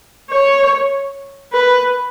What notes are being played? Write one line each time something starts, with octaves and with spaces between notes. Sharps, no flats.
C#5
B4